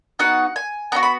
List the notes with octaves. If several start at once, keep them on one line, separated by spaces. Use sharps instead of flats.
B3 D#4 F#4 F#5
G#5
B3 D#4 F#4 A#5
B5